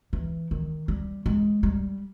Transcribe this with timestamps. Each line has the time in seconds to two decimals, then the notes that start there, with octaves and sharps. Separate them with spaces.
0.13 E3
0.51 D#3
0.88 G3
1.26 G#3
1.63 G3